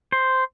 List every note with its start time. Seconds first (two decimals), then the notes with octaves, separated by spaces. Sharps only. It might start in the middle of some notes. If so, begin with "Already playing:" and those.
0.12 C5